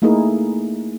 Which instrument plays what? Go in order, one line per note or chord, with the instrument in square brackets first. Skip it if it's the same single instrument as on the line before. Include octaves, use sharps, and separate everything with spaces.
[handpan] A3 A#3 D#4 E4 G#4 A#4